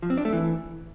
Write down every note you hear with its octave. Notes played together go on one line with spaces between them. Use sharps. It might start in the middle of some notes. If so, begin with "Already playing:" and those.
F3
C4
D4
A3
E3